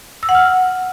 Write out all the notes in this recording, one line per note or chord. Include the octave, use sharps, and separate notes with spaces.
E6
F#5
F6